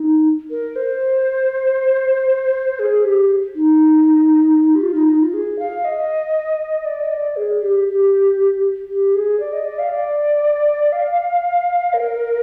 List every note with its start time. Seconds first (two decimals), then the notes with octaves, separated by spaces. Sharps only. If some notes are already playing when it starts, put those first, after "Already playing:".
Already playing: D#4
0.50 A#4
0.76 C5
2.79 G#4
3.05 G4
3.55 D#4
4.75 G4
4.82 F4
4.95 D#4
5.07 D#4
5.21 F4
5.34 G#4
5.59 F5
5.85 D#5
6.85 D5
7.02 D#5
7.12 D5
7.36 G#4
7.62 G4
7.88 G4
8.89 G4
9.15 G#4
9.40 D5
9.53 D#5
9.65 D5
9.79 F5
9.90 D5
10.92 F5
11.94 A#4